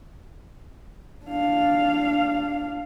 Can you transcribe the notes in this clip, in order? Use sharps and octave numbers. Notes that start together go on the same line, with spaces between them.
D4 F5